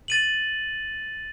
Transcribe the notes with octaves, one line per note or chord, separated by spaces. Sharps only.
A6 D#7 F#7